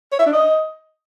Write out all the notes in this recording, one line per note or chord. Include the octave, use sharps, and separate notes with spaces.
C#5
E5
D4
D#5